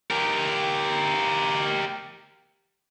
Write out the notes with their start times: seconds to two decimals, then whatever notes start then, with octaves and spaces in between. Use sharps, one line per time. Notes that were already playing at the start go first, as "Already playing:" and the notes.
0.10 G4 A#4